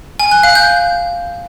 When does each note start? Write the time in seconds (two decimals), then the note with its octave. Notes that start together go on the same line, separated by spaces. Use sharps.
0.20 G#5
0.31 F#6
0.43 F5
0.55 G6